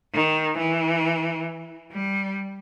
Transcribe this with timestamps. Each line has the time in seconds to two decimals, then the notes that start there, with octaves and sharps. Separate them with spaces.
0.14 D#3
0.59 E3
1.92 G3